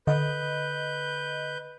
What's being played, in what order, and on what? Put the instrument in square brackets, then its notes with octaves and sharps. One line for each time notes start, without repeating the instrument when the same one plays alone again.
[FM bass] D3 [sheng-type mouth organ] B4 G6 [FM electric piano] D#5